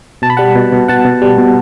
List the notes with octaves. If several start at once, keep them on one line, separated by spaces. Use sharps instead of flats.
B2 A5
B5
G3 F#5 A5
B2
B2
B2 F#5 A5
B2
G3
B2